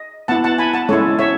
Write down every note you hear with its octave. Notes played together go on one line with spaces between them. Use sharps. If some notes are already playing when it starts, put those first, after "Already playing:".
Already playing: D#5
B3 E4 F#5 A5
F#5 A5
G#5 B5
F#5 A5
G#3 C#4 E4 A4 C#5
C#5 E5